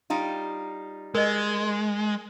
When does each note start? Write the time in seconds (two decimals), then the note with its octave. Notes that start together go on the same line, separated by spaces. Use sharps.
0.10 G3 D#4 F4
1.15 G#3 A#4 D#5